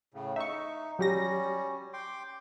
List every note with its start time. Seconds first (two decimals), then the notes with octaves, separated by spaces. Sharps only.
0.14 A2 C#3
0.36 D#4 E5 C#6
0.99 F#3 G3 C#4 G4 A#6
1.93 G5 C6 D6